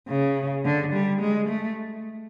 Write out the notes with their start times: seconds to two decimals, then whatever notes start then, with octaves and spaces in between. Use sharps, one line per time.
0.08 C#3
0.64 D3
0.92 G3
1.21 G#3
1.48 A3